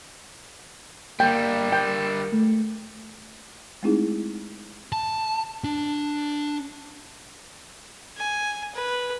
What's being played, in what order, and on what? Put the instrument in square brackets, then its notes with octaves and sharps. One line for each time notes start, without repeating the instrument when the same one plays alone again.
[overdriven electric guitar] D3 G3 [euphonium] A#3 [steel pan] G5
[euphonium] A#4 [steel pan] G5
[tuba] A3
[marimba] G#3 A3 C4 D#4 E4 G#4
[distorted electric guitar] A5
D4
[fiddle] G#5
B4